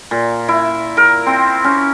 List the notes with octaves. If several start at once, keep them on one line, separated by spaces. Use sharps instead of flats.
A#2
E4
A#4
C4
C#4